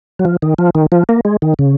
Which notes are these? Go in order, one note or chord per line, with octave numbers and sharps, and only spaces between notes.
F#3
F3
D#3
F3
D#3
F3
A#3
G#3
D#3
C#3